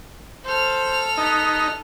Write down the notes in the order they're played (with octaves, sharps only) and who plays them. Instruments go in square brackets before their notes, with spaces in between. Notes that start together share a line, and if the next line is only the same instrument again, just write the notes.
[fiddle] A4 F6 [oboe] C5
[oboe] B3 [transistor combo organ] D#4